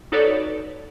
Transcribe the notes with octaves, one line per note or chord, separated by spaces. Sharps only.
D#4 F#4 A4 B4 C#5 D5